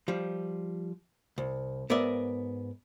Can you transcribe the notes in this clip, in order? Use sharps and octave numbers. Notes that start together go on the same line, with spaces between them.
F3 G3
C2
G#2 B3 A#4 D5 E5